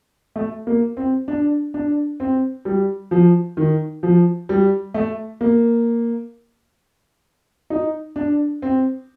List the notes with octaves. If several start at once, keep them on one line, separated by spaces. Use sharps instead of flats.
A3
A#3
C4
D4
D4
C4
G3
F3
D#3
F3
G3
A3
A#3
D#4
D4
C4